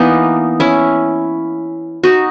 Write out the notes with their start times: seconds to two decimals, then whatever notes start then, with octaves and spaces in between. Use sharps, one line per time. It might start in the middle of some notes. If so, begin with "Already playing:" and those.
Already playing: E3 A#3 B3 D#4
0.60 C#4 E4
2.04 D#4 F#4